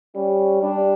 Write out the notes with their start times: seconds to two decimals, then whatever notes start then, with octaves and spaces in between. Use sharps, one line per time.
0.15 G3 C#4
0.62 G3 D4